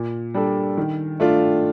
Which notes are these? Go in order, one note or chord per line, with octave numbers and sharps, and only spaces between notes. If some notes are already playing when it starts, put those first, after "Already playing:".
Already playing: A#2
G3 D4 A4
D#3
A3 D4 F4